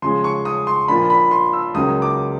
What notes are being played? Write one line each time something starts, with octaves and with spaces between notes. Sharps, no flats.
C#3 F3 G#3 C6
C#6
D#6
C6
A#2 F3 A#3 D4 B5
B5
C6
E6
C#2 C#3 F#3 A#3 D#6
D6